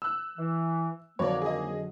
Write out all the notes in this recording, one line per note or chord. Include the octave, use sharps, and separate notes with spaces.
E6 F#6
E3
F2 D3 D#3 F#3 A#3 C#5 D5
G#4 D#5